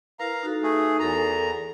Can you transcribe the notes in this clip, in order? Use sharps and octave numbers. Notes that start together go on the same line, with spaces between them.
E4 A#4 B4 F5 A#5
D#4 F#4 A4
A3 G#4
E2 A4 A#4 A#5